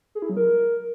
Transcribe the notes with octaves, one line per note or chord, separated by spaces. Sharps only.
G#4
E4
F#3
A#4